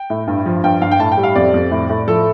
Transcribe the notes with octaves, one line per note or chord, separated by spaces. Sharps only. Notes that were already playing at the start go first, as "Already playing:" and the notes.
Already playing: G5
A2
G2
F3
G2 G5
G2 F5
G5
A2 A5
G5
G3
F5
F2 D5
F2
A2
A2
F3 A4